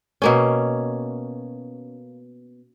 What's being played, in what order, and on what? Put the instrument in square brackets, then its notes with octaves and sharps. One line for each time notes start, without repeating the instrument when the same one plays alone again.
[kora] B2 A#3 C#4